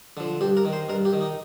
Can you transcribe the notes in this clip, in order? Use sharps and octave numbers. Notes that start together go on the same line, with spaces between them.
D3 F3
G2 G4
A#4
D#3
C5
G2 A#4
G4
D#3
D#4